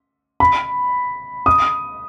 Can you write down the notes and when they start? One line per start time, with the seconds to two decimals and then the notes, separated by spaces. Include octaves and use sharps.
0.40 B5
1.46 D#6